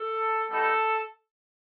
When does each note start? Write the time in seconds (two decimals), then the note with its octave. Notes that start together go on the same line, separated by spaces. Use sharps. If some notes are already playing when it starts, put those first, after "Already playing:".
Already playing: A4
0.49 G3 B3 D#4 F#4 A4